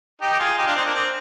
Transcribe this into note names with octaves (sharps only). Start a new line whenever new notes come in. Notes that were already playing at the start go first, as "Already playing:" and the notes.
D#4 G4
G4
F4 G#4
D#4 G4
D4 F4
C4 D#4
A#3 D4
C4